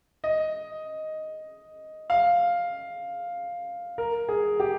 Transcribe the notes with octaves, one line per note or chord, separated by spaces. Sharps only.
D#5
F5
A#4
G#4
G4